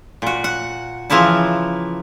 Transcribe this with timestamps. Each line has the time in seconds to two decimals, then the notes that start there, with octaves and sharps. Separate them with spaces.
0.22 A#2 F#4
0.44 F#5
1.10 C#3 E3 F3 A#3 E4 A5